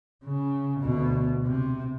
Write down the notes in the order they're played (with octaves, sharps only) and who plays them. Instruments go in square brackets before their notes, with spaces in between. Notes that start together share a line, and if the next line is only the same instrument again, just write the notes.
[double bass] C#3
D2 B2
C3